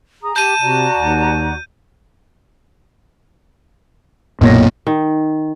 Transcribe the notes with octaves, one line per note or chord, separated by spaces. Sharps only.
G#4 A#5 D#6
G4 A5 G6 D#7
C3 F#4 D5 A#5 D#7
D#2
B1 F#2 A#2 A#3 C#5 A#6
D#3